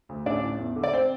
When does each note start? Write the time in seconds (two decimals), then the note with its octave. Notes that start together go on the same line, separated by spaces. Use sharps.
0.09 D2
0.26 A1 D4 D5
0.43 A2
0.59 E2
0.76 D3
0.84 D5
0.93 C4 C5